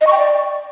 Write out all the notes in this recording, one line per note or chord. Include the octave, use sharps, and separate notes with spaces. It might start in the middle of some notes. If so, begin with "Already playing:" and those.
D#5
C#6
G5
D5